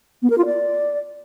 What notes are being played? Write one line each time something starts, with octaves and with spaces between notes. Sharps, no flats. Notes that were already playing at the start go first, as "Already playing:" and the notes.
B3
A#4
F4
D5